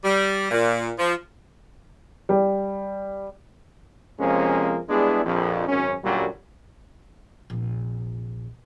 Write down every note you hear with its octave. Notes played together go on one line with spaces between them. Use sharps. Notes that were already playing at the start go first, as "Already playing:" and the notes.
G3
A#2
F3
G3
F2 C3 F3 G#3 A#3 C#4
G3 G#3 B3 D4 E4 G#4
A#1 F2
G#1 F#2 C#4
F#2 A#2 D3 F#3 G3
F1 A#1